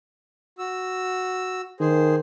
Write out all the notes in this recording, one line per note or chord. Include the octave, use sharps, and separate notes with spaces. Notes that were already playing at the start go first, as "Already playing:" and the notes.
F#4 E6
D#3 G#4 C5